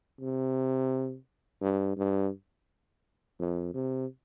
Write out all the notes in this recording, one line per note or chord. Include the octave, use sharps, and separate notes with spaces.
C3
G2
G2
F2
C3